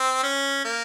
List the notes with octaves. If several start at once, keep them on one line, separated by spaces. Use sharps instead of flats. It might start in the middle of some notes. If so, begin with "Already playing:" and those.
Already playing: C4
C#4
A#3